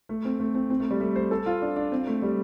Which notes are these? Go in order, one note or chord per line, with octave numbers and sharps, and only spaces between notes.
A3
C4
A3
C4
C4
A3
G3
A3
C5
A4
F4
D4
D4
C4
A3
G3